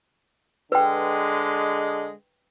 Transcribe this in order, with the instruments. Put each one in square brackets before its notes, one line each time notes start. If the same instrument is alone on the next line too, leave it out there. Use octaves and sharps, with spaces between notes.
[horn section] D3 G#3 [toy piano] B4 G5